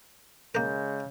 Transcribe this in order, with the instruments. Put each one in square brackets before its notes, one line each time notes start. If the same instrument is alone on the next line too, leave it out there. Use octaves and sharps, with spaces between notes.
[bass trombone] C#3 [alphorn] G#3 [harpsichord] A#3 A#4 [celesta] G6